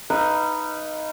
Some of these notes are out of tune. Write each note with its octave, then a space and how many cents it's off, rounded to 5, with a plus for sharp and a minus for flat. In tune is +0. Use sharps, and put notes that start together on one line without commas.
D#4 +0 B4 +0 F5 -30